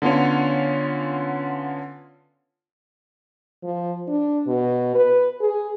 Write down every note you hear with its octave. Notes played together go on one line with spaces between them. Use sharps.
D3 B3 C#4 F4 C#5
F3
D4
B2
B4
G#4